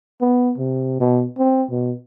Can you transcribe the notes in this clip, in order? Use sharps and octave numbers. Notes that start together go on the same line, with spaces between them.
B3
C3
B2
C4
B2